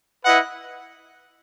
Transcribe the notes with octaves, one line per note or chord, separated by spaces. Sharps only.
E4 B4 D#5 F#5